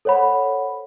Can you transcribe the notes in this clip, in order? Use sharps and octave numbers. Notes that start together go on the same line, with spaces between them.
A4 C5 C#5 F#5 B5